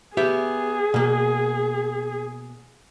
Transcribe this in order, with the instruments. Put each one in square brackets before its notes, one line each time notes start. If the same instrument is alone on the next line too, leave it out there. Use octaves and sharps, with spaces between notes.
[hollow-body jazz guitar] B3 G4 E5 [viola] G#4
[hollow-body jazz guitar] B2 A#3